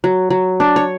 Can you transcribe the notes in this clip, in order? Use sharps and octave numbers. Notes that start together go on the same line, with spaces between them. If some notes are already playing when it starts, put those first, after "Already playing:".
F#3
F#3
D4
C#5